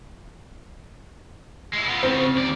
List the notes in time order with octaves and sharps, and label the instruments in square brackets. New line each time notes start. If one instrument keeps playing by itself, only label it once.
[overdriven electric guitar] G#3 E4
B3 F4
[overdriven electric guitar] C#3 F3 [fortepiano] C4
[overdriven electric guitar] D#2 D5